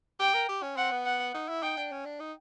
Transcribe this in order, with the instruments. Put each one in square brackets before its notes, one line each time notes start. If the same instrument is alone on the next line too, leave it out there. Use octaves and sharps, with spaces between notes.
[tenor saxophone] G4 [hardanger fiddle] G5
[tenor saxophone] A#4
G4
C#4
[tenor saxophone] C4 [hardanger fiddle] F#5
[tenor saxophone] B3
[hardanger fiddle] F#5
[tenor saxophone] D#4
E4
[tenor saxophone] D#4 [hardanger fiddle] G5
[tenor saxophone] D4
C#4
D4
D#4